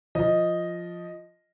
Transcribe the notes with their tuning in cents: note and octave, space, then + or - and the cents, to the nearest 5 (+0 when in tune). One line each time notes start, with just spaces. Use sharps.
F3 +0 D#5 +0